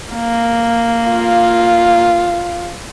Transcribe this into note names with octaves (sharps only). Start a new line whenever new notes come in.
A#3
F4